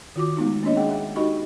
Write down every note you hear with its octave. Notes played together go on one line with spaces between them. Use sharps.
D#3 F4 F#4 D6
G#3 A3 B3 D#4
A#3 B3 C#4 D4 C#5 D#5
G#4 D#5 F#5 G5
G#4 E5
D#4 F#4 G4 D#5 B5 C#6